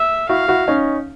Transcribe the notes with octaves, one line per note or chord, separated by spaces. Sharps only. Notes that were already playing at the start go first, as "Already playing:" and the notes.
Already playing: E5
E4 F#4 F5
E4 F#4
C#4 D#4